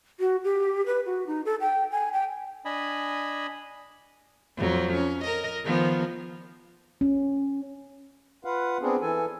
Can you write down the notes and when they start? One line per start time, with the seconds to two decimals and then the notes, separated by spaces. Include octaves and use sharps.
0.20 F#4
0.44 G4
0.86 B4
1.06 F#4
1.27 D#4
1.45 A4
1.61 G5
1.91 G#5
2.13 G5
2.65 D4 D#5 G#5 B5
4.57 F2 F#3
4.93 C#4
5.24 A#4 D#5
5.64 D#3 F3 B3
7.01 C#4
8.45 F4 B4 F5 F#5
8.82 B3 C4 D4 G#4
9.01 E3 A4 G#5